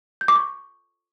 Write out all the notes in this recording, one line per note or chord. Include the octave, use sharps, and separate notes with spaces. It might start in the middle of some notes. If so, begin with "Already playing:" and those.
G6
D6
C#6